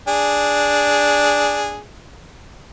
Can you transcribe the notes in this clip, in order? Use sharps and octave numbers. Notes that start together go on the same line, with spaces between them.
D4 G#4